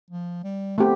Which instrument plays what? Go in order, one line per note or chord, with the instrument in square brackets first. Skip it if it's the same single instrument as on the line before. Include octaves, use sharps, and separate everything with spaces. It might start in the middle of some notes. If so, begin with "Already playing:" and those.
[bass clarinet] F3
G3
[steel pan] A3 C4 G4 [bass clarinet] B3